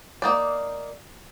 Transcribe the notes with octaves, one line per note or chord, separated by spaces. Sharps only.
A#3 D#4 D5